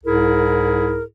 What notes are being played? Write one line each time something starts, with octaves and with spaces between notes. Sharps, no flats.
C2 G#2 E4 G#4 A#4